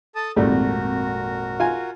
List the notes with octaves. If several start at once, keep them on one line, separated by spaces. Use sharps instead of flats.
A4 A5 D#6
G#1 F2 A#2 G3 A3 F#4 A#4
F4 G#5